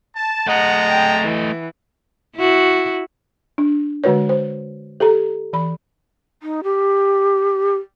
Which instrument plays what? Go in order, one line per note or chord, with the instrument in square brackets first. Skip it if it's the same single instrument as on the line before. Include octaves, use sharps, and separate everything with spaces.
[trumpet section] A5
[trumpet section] G#3 A5 A#5 [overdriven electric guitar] A3 D#5 [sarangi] F#5
[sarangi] G5
E3
[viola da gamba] E4 F#4
[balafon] D4
D3 G#3 F#4 B4 C#5
C5
G4 A4 A#5
E3 B5
[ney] D#4
G4